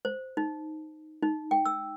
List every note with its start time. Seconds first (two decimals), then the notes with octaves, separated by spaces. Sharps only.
0.05 C5
0.37 D#4
1.22 D#4
1.51 G5
1.65 E6